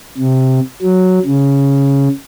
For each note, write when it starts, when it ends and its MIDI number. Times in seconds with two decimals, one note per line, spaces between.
0.18 0.60 48
0.82 1.19 54
1.25 2.08 49